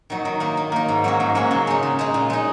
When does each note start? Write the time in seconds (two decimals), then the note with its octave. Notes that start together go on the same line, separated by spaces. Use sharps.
0.10 D#3 F#3 D#4
0.25 D#3
0.40 A#3 D#4
0.57 D#3
0.72 A#3 D#4
0.88 G#2
1.04 F#3 A#3 C#4
1.20 G#2
1.35 F#3 A#3 C#4
1.51 C#3
1.67 G#3 D#4
1.83 C#3
1.99 G#3 D#4
2.14 A#2
2.30 G#3 D#4